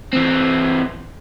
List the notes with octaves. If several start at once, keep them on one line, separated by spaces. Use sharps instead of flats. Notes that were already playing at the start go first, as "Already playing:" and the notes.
E3 C4